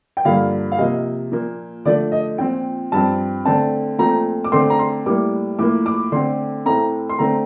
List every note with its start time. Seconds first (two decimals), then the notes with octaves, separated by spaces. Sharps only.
0.17 G5
0.25 G2 D3 F3 A#3 F5
0.72 F5
0.78 C3 F3 A#3 D#5
1.32 A#2 F3 A#3
1.85 D3 F3 A3 D5
2.12 D#5
2.38 A#2 F3 C4 G5
2.92 G2 F3 C4 A5
3.45 D3 A3 C4 A5
3.99 A#2 F3 A3 C4 A#5
4.44 D6
4.52 D3 A3 C4 C6
4.70 A#5
4.79 C6
5.06 A2 G3 A#3 D6
5.59 A2 F3 A#3 D6
5.86 D6
6.12 D3 A3 C4 C6
6.65 A2 A3 C4 A#5
7.09 C6
7.19 D3 A3 C4 A#5